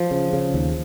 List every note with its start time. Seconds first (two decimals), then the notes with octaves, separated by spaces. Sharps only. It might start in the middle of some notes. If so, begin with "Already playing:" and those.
Already playing: F3
0.11 C#3
0.33 C#3
0.54 D#2